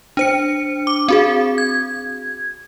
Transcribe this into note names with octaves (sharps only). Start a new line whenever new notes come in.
D4 C5 C#7
D6
C4 F#4 G#4
G#6